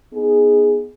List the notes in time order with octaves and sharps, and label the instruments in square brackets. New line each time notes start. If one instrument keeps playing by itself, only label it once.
[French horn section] B3 D#4 G#4